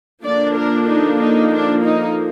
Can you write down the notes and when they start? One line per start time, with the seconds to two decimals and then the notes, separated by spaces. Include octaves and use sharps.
0.23 D3 F3 A#3 D4 D5
0.56 A#4
0.88 D#4
1.19 D#4
1.52 D4
1.83 D#4